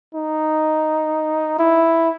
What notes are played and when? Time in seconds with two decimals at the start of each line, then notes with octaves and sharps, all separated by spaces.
0.15 D#4
1.59 E4